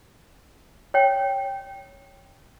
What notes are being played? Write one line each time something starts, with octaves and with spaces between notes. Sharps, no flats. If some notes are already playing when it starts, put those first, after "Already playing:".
C#5 G5